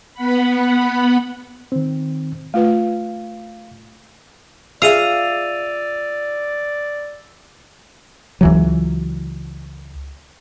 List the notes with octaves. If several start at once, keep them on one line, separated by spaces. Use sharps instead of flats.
B3 F#5 B5
D#3 C4
A3 F4 B4 F5
F4 G#4 D5 E5 F5 E6 D#7 F7
C#2 E3 F#3